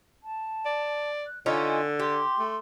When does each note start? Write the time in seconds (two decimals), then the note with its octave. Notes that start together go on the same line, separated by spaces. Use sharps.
0.23 A5
0.65 D5
1.26 F#6
1.46 D3 C#4 D#4 F4 G#5
1.99 G4 C6
2.39 A3